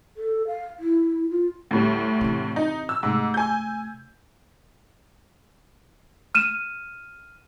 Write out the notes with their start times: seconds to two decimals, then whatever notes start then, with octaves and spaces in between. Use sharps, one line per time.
0.17 A4
0.47 F5
0.79 E4
1.31 F4
1.71 D2 A2 G3
2.21 E2 C3
2.56 D#4
2.89 E6
3.03 G#2 C3 A3
3.34 G#5 G6
6.35 F6 D#7 E7